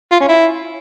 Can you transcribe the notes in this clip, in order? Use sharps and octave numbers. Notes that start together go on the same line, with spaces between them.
F4
C#4
E4